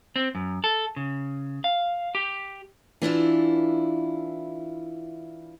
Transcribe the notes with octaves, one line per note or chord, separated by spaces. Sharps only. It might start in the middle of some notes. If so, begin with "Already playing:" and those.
C4
F#2
A4
C#3
F5
G4
E3 D4 E4 F4